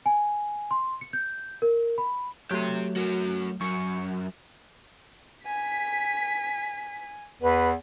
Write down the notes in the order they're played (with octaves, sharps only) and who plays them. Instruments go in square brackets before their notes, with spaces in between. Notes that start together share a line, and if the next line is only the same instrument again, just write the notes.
[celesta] G#5
C6
C#7
G6
A#4
B5
[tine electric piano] F#3 A3 [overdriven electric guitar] G4 C6
[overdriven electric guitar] F#4 A#4
[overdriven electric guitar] F#2 [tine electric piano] C#6 C#7
[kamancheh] G#5 [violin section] B6
[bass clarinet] E2 [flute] B4